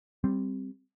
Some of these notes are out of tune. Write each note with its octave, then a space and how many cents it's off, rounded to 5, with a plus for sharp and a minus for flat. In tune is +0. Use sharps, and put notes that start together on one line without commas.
G3 +0 C4 +0